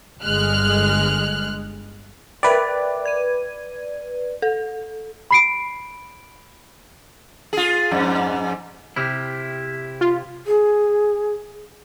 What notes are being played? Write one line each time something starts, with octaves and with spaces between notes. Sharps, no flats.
G1 G#3 F6 F#6
A#4 B4 D5 E5 G5
G#6 D#7
A4
B5 C7 D7
F4 G#4
F2 G#2
C3 E4 G4 F6
F4
G#4